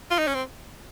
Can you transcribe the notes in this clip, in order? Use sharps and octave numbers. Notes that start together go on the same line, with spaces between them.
F4
D#4
C#4
C4